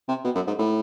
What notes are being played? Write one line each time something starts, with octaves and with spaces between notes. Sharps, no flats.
C3
B2
F#2
G#2
A2